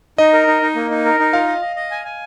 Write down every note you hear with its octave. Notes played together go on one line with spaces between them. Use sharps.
D#4 D#5
A#4
D#4
D#4
A#3
D#4
A#4
D#4
F4 F5
D#5
D#5
D#5
G#5
G#5